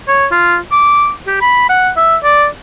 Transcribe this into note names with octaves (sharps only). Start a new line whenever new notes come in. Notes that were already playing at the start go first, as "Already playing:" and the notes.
C#5
F4
D6
G4
B5
F#5
E5
D5